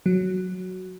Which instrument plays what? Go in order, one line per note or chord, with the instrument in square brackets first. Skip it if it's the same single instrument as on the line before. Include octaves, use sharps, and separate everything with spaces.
[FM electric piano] F#3